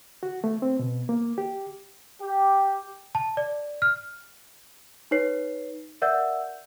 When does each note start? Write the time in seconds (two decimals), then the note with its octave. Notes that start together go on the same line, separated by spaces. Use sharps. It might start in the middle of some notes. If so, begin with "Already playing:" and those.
0.23 F#4
0.44 A3
0.62 C4
0.79 B2
1.09 A#3
1.38 G4
2.21 G4
3.15 A5
3.37 D5
3.82 F6
5.11 D#4 B4 C#5 C7
6.02 A#4 D5 E5 F#5 E6 G6